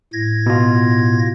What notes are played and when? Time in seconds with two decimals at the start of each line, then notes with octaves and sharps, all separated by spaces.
0.13 A2 G#6 A#6
0.46 B2 F4